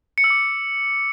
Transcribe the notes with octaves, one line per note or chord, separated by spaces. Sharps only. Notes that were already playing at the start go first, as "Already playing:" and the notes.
C#7
E6
D6